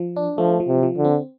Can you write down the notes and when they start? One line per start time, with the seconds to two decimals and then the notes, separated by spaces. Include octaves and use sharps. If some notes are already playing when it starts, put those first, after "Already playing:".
Already playing: F3
0.16 D4
0.38 F3 A3
0.60 F3
0.67 C3
0.83 F3
0.97 D3
1.05 C4